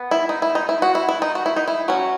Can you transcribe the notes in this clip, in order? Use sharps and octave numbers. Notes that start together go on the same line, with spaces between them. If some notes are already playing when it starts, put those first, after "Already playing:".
Already playing: B3
E4
D#4
E4
D#4
E4
F#4
E4
E4
D#4
F#4
E4
D#4
E4
F#3 C#4 F#4